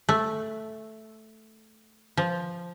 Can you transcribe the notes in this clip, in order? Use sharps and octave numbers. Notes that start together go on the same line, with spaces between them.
A3
F3